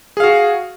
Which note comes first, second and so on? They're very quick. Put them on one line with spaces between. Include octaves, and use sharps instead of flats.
G#4 F5 F#4